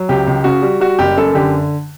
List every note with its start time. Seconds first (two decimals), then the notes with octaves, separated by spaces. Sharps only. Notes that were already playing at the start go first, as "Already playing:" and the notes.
Already playing: F#3
0.09 C#2 G4
0.27 C#2
0.44 C#3 F#4
0.62 G3
0.80 G3 F#4
0.99 F#1 G4
1.17 F#2 A4
1.35 D3 G4